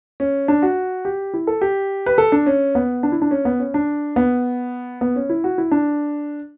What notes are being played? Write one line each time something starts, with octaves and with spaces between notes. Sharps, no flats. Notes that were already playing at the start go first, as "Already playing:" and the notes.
C#4
D4
F#4
G4
E4
A4
G4
B4
A4
D4
C#4
B3
D4
E4
D4
C#4
B3
C#4
D4
B3
B3
C#4
E4
F#4
E4
D4